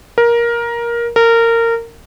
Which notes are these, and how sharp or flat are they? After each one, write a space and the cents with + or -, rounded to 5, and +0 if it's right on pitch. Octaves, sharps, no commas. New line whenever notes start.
A#4 +15
A#4 -20